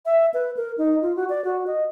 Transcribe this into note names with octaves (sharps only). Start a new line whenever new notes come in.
E5
B4
A#4
D#4
F4
F#4
D5
F#4
D#5